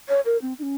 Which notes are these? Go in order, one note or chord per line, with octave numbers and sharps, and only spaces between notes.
C#5
A#4
C4
D#4
C#4